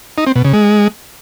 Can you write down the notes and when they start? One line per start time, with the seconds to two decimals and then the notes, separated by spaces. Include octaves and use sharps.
0.18 D#4
0.27 C4
0.36 B2
0.45 C#3
0.54 G#3